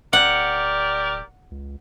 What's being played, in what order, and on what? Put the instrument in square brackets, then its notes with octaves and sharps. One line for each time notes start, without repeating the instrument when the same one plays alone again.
[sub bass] D1 [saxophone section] G4 A#4 D5 [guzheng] F#5
[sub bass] C#2